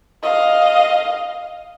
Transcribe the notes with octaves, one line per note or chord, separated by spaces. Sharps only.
D#5 F5